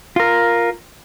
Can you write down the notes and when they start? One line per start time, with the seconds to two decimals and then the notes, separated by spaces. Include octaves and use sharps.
0.16 F4 A#4